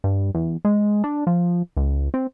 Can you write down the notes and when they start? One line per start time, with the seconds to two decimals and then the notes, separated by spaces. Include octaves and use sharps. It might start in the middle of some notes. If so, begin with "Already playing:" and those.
0.04 G2
0.35 E2
0.65 G#3
1.04 D4
1.27 F3
1.77 C#2
2.14 C4